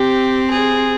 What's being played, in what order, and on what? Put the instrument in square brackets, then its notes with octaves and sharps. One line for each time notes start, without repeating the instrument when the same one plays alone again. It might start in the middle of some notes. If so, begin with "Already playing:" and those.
Already playing: [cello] C4 [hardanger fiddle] G4
[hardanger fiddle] G#4